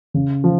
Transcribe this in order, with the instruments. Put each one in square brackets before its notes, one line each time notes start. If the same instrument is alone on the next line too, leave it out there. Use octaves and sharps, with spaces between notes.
[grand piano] C#3
F3